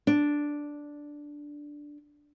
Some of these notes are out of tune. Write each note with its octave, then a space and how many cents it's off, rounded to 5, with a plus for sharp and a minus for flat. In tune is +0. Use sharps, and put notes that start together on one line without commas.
D4 -5